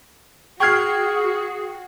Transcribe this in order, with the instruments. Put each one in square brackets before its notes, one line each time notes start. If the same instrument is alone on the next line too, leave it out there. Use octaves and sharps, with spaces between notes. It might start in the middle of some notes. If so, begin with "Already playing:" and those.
[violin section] F#4 [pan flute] G#4 [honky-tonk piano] G5 F6 [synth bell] C#6 G#6 C7